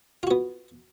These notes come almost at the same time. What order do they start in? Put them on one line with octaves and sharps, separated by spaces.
F4 F#4 B3